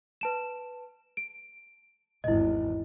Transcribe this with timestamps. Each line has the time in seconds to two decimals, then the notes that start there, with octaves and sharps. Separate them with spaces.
0.21 B4 A5 E7
1.17 D7
2.24 G#1 E2 E4 D#5